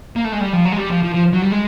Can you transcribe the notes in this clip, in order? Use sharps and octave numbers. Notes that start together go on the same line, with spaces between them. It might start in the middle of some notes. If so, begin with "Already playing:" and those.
A#3
A3
G#3
G3
F3
F#3
G#3
G3
F3
F3
F3
F#3
G3
G#3